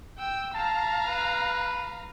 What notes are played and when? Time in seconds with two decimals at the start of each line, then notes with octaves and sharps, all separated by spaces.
0.18 G5 E6
0.55 F5 A5 A#5
1.06 B4